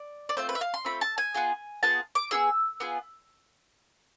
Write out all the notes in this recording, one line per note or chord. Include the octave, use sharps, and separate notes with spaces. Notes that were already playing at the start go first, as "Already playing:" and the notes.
Already playing: D5
D5
A3 C4 F4 C5
B4
E5
F5
C6
A3 C4 F4 B5
A5
G#5
B3 F4 G#4
B3 F4 G#4 A5
D6
B3 F4 G#4 E6
B3 F4 G#4